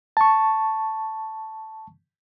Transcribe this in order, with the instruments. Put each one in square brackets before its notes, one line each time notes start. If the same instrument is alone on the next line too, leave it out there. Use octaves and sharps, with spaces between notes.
[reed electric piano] A5 C#6